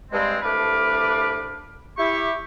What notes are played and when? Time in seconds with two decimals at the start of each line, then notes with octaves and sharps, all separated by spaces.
0.12 G2 G#3 C4
0.42 C2 A3 D4 B4 F5 D6
1.97 E4 G4 C#6